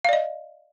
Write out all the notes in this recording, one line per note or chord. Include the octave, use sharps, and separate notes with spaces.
D5 D#5 F5